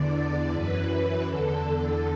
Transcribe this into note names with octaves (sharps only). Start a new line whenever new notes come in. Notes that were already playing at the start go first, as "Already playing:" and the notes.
Already playing: E2 D3 D5
F#2 E3 B4
E2 D3 A4